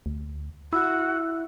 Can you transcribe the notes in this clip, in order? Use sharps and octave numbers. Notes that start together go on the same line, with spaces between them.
D2
E4 F#4 E6